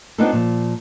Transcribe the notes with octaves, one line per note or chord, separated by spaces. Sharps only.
B3 C4 D4 D#4 F4 A4
A#2 F3